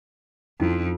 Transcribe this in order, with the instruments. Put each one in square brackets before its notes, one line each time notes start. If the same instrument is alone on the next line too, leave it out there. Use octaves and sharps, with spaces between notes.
[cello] F2 [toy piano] C#4 D#4 E4